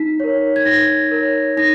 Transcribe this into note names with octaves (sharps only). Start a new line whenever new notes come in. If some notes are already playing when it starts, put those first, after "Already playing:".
Already playing: D#4 B6
A#4 C#5
G#6
D#4 A#6
A#4 C#5
D#4 A#6